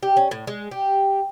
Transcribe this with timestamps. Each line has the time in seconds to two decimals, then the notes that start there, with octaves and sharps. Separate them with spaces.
0.03 G4
0.17 C#4
0.31 A2
0.47 G#3
0.71 G4